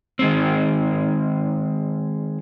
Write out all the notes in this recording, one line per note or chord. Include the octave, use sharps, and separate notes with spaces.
D#3 G#3 C4